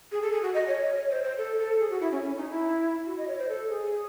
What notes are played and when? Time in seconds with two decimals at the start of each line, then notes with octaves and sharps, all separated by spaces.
0.12 G#4
0.22 A4
0.32 G#4
0.42 F#4
0.54 D#5
0.68 C#5
0.82 C#5
0.96 C#5
1.10 C5
1.24 C5
1.38 A4
1.59 A4
1.80 G#4
1.90 F#4
2.01 E4
2.12 C#4
2.22 C#4
2.36 D#4
2.50 E4
3.06 F#4
3.18 D#5
3.28 C#5
3.39 C5
3.49 A4
3.70 G#4